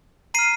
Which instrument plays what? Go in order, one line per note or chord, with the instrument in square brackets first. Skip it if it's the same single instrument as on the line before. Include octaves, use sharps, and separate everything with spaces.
[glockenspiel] A#5 F6 C7 D#7